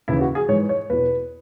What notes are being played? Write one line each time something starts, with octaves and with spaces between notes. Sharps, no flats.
D#2 C#3 E3 E4
F#4
G#4
G#2 E3 C#5
C#5
E2 B2 B4